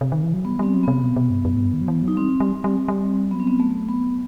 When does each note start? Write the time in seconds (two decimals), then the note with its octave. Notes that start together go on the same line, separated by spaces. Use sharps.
0.01 C3
0.12 D#3
0.23 E3
0.34 F#3
0.45 G3 B3
0.59 G3 C4
0.74 F#3
0.83 C3 B3
1.02 B2
1.16 B2
1.30 G2
1.45 F#2
1.55 A2
1.59 G2
1.73 D#3
1.81 F#3
1.88 E3
2.02 F#3
2.08 D#4
2.17 G3 C4
2.40 G3
2.64 G3
2.88 G3
3.31 F#3 B3
3.40 C4
3.47 B3
3.60 A3
3.89 B3